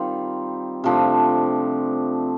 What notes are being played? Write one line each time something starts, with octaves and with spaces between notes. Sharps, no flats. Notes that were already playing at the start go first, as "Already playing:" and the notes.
Already playing: D#3 G3 C4 F4
C3 F3 A3 D4